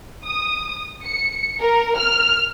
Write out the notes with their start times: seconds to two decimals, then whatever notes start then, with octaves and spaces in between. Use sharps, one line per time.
0.25 D#6
1.06 C#7
1.61 A#4
1.97 F6